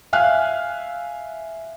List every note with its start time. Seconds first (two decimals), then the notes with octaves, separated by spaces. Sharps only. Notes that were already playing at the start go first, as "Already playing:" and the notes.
0.13 E5 F5 G#5 F6 F#6